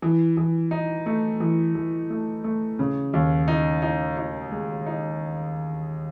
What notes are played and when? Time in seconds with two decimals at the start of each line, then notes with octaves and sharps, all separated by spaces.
0.02 E3
0.37 E3
0.71 D#4
1.06 A3
1.40 E3
1.75 E3
2.10 A3
2.44 A3
2.79 C#3
3.13 D#2
3.48 D#4
3.82 D#4
4.17 D#4
4.51 G#3
4.86 D#4